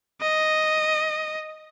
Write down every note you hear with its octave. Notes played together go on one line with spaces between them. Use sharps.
D#5